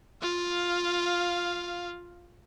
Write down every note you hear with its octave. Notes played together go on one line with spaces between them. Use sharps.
F4 F5